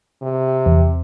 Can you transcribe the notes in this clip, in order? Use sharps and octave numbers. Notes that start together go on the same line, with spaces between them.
C3
E2